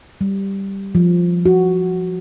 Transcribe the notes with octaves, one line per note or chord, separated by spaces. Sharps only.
G3
F3
F#4